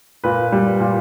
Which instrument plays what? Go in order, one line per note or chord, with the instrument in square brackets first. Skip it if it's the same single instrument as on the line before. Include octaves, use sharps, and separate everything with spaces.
[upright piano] A#2 B4
G3
A#2